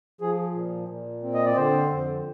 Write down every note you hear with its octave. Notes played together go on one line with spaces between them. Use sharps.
F3 G#4
A#2
A#2
C4
D#5
D5
D3 C5
F2